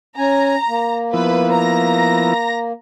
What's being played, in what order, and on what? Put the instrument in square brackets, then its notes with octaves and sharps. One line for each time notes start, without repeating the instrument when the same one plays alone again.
[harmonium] C#4 G#5 [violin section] A#5
[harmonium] A#3
[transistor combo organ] F3 B3 E4 [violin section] B4
[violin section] A#5 A#6